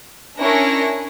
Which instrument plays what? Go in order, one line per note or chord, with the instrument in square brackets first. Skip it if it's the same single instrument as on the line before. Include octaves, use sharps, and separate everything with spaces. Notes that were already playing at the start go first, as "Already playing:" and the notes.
[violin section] C#4 D4 E4 A#4 C#6 A#6